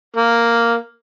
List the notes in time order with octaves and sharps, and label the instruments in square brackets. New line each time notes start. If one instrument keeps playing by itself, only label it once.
[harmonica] A#3